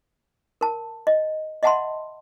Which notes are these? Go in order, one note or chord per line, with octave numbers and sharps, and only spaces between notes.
A#4 A5
D#5
D#5 E5 F#5 A5 B5 C6